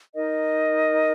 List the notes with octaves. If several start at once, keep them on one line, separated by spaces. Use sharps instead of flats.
D#4 A#4 D#5